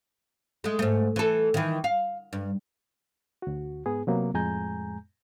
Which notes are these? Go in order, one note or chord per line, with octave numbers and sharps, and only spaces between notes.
G#3 A3
G#2 A3
E3 A4
D#3 E3
F5
G2
D2 F#4
G#2 B3 G#4
C3 F#3 A#3 B3
F2 A2 G#3 G#5 A#5 G6